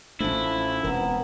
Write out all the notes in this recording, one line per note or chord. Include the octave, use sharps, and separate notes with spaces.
A1 F3 A3 C#4 D4 E4
E1 B3 C4 A#4